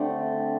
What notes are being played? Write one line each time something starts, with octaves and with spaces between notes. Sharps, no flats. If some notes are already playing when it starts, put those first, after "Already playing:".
Already playing: D3 A3 C4 G4 D5